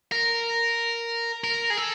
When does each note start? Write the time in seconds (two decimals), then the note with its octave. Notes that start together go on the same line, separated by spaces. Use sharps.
0.12 A#4
1.44 A#4
1.70 G#4
1.77 A4